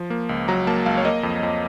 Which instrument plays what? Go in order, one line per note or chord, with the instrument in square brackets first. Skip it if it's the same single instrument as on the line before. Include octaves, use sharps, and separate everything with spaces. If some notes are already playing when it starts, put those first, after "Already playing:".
Already playing: [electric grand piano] F3
A#3
C#2
F#3 A#5
A#3 A5
C#2 F5
C#5
A#3 D#5
F2
F2